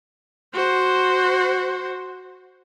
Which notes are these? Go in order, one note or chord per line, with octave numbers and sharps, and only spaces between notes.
F#4 C5